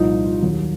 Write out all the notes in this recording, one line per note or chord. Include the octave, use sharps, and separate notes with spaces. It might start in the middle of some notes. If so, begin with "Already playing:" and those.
Already playing: C2 A#2 F3 D#4
F4
D#2 D#3 F#3